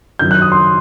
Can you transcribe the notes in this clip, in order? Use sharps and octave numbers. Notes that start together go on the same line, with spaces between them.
F#2 D#3 F#3 G6
F#6
D#6
C6